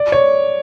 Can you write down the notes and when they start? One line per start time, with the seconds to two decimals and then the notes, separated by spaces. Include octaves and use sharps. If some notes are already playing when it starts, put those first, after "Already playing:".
Already playing: D5
0.12 C#5